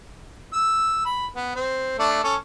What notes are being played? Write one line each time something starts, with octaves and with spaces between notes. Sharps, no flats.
E6
B5
B3
C4
A3 D4
C#4 A4